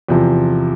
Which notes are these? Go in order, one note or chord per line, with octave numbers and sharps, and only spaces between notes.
E2 C3 F3